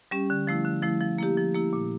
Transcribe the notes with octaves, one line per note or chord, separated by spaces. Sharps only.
G3 C#4 G4
D3
F3 A3 E4
D3
F3 A3 E4
F3
A#3 E4 G4
F3
A#3 E4 G4
A#2